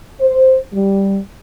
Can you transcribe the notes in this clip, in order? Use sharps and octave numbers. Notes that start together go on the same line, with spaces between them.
C5
G3